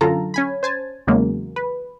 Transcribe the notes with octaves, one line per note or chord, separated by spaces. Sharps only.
F#2 D3 F4 A4 A#5
C#4 G#5 B5
C5 G#5 A5
E2 C#3 F#3 G#3 A#3
B4